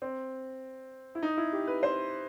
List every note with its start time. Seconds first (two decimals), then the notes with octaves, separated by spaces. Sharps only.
0.02 C4
1.15 E4
1.23 D#4
1.37 E4
1.53 G4
1.67 B4
1.83 C5